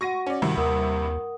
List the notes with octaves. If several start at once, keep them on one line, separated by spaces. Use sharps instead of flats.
F#4 F#5 C#6 A#6 D#7
C#4 D5
G2 C3 D#3 E4
D#2 A#4 F#5 D#6